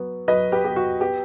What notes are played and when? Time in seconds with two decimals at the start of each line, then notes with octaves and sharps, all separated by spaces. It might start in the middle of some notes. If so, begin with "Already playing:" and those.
Already playing: F#3 B3
0.28 F#3 B4 D#5
0.52 G4 B4
0.64 B3 G4
0.76 F#4
1.00 B3 G4